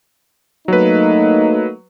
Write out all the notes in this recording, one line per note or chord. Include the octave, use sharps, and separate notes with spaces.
F#3 A3 A#3 D#4 B4